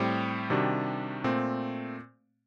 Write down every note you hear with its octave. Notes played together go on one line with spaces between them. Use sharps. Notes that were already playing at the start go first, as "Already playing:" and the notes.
Already playing: A2 G3 C4 G4
C3 D#3 G3 D4 F#4
A#2 A3 C4